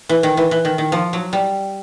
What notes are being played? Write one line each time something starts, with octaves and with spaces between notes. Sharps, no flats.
E3
D#3
E3
E3
D#3
D#3
F3
F#3
G3